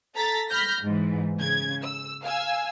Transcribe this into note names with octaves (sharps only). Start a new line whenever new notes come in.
A4 A#5 A6 B6
B5 F6 G6 A#6
G#2 E3
C#3 G#6
E6
F5 G#5 E6